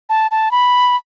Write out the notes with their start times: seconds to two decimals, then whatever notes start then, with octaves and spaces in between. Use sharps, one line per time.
0.09 A5
0.31 A5
0.51 B5